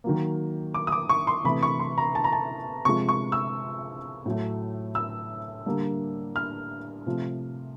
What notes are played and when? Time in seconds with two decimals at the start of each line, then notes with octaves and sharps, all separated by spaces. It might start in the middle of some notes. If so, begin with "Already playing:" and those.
0.04 D#3 F#3 A#3
0.74 D6
0.87 D#6
0.92 D6
1.09 C#6
1.27 C6
1.44 C3 E3 A3 B5
1.63 C#6
1.80 C6
1.98 A#5
2.15 A5
2.24 A#5
2.33 A5
2.85 C3 F3 G#3 C#6
3.09 C#6
3.32 E6
4.26 A2 F#3 A3
4.95 E6
5.66 D3 G3 A#3
6.36 F6
7.06 C3 F3 A3